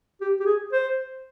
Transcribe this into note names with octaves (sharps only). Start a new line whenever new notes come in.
G4
G4
G#4
C5